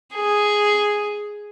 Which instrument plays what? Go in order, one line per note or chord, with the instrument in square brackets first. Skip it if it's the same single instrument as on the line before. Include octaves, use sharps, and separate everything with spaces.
[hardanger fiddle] G#4